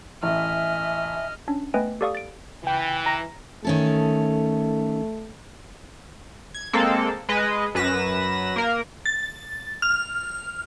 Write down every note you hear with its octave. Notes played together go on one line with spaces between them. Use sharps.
A1 D#5 E5 G#5 F6
C#4 D4
A3 B3 B4 D#5 G5 G#5
G4 A4 D5 F5 C#6 D#6
A6 D7
C#2 E3 G5
A#5
D#3 A3 C#4 A4
G#6
G#3 A#3 C4 A4
G#3 B4 D#5
F#2 B4 A#6 E7
A#3 A#4
A6
F6